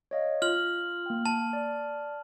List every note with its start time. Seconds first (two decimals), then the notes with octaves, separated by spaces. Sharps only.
0.11 C#5 D#5 F5
0.42 F4 F6 F#7
1.06 A#3 G5
1.26 A5
1.53 D5